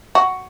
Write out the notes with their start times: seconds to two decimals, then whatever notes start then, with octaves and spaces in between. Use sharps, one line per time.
0.15 F#4